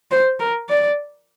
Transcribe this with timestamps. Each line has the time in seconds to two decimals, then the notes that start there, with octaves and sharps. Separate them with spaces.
0.11 C5
0.40 A#4
0.69 D5